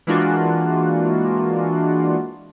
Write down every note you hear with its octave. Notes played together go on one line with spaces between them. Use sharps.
E3 G#3 A#3 D4 F4 F#4